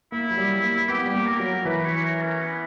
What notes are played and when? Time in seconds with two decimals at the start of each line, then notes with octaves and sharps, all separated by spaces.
0.12 A#3 E4
0.31 F#3
0.38 G3
0.63 A#3
0.89 B3 G4
1.06 G3
1.14 A#3
1.26 A#4
1.40 F#3
1.65 E3 B4
1.77 B4
1.85 C#5
2.03 A#4
2.22 C#4
2.41 B3